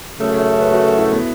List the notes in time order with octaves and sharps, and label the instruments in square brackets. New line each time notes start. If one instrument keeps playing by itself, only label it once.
[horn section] F#2 C#3 A3
[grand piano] C#5
B4
F#4
A4
E4
B3